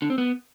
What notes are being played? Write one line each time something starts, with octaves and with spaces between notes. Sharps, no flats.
D3
C4
B3